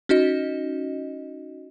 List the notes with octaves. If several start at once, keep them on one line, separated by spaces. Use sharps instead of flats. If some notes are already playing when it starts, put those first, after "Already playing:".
C#4 D#4 F#4 D#5